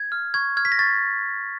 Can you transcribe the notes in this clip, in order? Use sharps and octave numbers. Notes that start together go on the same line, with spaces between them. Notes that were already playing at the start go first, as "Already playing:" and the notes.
Already playing: G#6
F6
C#6 G#6
F6 G#6
B6
A#6
C#6 A6